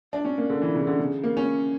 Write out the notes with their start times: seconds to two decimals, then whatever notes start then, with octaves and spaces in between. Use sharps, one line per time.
0.13 D4
0.25 C#4
0.38 A#3
0.50 D3
0.62 E3
0.75 C#3
0.87 D3
0.99 C#3
1.24 A#3
1.37 C#4